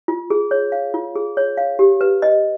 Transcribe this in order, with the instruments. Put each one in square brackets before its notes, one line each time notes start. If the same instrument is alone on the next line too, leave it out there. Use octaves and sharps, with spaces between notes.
[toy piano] F4
G#4
C#5
F5
F4
G#4
C#5
F5
G4
B4
D#5